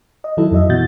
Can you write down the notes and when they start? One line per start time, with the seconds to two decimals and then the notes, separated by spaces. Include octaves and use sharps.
0.24 D#5
0.37 D#3 F#3 E4 A4
0.51 F2 F#3 D#5 E5
0.70 B2 E3 F#4 G6 A6